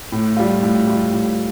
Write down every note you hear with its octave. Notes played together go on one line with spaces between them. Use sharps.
A2
G3 F4
A2
G3 F4
A2